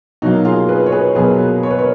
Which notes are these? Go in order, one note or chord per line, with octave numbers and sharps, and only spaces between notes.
B2 F#3 A#3 D#4 F#4
F4 G#4
G#4 B4
C#5
G#4 B4
B2 F#3 A#3 G#4 B4
C#5
B4
A#4 C#5